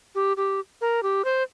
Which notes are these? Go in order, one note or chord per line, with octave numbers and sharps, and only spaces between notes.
G4
G4
A#4
G4
C5